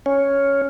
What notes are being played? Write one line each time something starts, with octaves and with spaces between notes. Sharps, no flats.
C#4